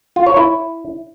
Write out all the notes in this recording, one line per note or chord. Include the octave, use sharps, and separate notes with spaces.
F4
C#5
E4